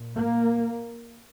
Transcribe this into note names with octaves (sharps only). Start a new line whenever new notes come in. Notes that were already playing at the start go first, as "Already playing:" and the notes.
Already playing: A#2
A#3